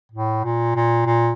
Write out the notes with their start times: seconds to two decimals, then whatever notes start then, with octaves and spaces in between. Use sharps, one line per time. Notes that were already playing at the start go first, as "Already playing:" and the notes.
0.12 A2
0.44 A#2
0.76 A#2
1.06 A#2